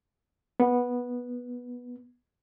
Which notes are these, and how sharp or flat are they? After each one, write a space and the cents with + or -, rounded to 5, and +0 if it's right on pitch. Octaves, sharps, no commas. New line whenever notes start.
B3 -10